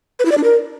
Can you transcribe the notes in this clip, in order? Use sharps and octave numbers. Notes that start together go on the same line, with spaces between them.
B4
E4
D5
D4
A#4